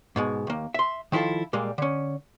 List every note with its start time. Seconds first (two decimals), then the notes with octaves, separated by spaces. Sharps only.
0.16 G#2 B2 G#3
0.47 D#2 A#3
0.74 E5 C6
1.12 D#3 F3 E4 F4 A4
1.53 A#2 G3 G#3 A#3
1.78 D3 C#4